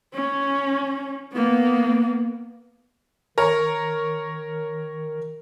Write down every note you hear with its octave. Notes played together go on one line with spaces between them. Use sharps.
C#4
A#3 B3
D#3 A#4 C#5 A#5